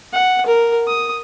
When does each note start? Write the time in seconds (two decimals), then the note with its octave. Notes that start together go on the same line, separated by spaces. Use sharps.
0.13 F#5
0.46 A#4
0.87 D#6